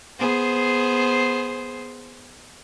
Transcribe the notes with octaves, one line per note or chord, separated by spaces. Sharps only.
B3 G#4 C5